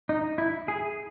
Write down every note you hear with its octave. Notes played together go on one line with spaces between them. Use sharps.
D#4
E4
G#4